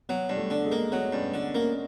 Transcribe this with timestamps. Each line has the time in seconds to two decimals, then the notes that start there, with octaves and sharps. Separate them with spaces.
0.09 F#3 B3
0.29 G2
0.37 A3
0.50 D3
0.65 G#3
0.72 A#3
0.92 F#3 B3
1.12 G2 C#4
1.34 D3 D4
1.54 A#3 C#4